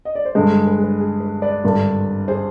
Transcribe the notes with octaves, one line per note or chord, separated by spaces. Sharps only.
D#5
D5
C5
G2 D3 G#3 B4
G#4
B4
G#4
B4
G#4
B4
B4 D5
G#1 G2 D3
G#4 C5